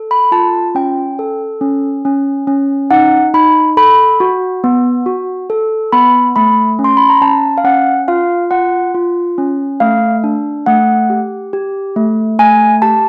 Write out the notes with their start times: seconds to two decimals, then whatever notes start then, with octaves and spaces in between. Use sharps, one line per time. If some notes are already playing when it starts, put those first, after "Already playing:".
Already playing: A4
0.11 B5
0.32 F4 A5
0.75 C#4 G5
1.19 A4
1.61 C#4
2.05 C#4
2.47 C#4
2.91 D#4 F#5
3.34 D#4 B5
3.77 A4 B5
4.20 F#4
4.64 B3
5.06 F#4
5.50 A4
5.93 B3 B5
6.36 A3 B5
6.79 C#4
6.84 C6
6.97 B5
7.10 A#5
7.21 C#4 A5
7.58 F5
7.65 C#4 F#5
8.08 F4 F5
8.51 F4 F#5
8.94 F4
9.38 C#4
9.80 A3 F5
10.24 D4
10.66 A3 F#5
11.10 G4
11.53 G4
11.96 A3
12.39 A3 G#5
12.82 G4 A5